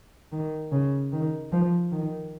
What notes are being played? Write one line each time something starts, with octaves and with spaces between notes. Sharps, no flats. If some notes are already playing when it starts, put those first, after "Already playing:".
D#3
C#3
D#3
F3
D#3